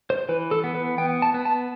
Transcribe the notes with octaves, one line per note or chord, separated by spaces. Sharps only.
C5
E3 B4
A4
B3
B4
B3 G5
A5
B3
A5